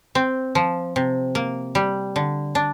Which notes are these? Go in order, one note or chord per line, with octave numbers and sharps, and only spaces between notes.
C4
F3
C3
A#3
G3
D3
D4